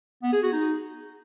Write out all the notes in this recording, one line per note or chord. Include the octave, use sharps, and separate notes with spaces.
B3
G#4
F#4
D#4